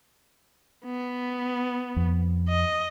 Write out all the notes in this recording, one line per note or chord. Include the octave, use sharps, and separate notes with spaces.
B3
F2
D#5